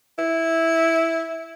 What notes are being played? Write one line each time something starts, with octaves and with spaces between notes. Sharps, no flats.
E4